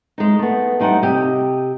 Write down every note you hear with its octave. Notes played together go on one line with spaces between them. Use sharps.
G#3 D#4
A3 B3
E2 G3 D#4 E4 F#5 A5
C3 G4 D#5